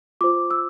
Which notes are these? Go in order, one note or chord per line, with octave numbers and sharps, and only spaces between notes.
F4 C5 D6
E6